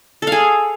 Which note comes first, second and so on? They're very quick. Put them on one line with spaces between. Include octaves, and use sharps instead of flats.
A4 F5 G#4